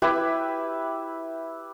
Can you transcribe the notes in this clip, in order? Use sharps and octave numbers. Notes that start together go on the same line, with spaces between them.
E4 G4 B4 E5